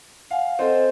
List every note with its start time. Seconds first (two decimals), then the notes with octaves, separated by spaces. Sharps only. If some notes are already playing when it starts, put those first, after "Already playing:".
0.31 F5 F#5 G#5
0.59 C4 A4 C5 D#5